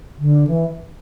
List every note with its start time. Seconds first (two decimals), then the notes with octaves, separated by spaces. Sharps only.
0.18 D3
0.47 E3